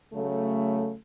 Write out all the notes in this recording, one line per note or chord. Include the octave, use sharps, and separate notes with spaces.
C#3 F#3 A3